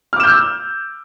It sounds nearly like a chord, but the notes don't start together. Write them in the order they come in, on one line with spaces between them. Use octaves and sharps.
F6 D6 E7 G6 E6